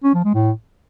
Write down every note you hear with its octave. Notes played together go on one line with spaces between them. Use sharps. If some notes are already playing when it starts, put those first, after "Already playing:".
C#4
F3
G#3
A2